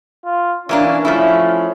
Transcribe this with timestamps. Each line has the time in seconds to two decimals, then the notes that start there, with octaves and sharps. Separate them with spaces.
0.25 F4
0.69 E3 A#3 C#4 D4
1.05 F3 A3 E4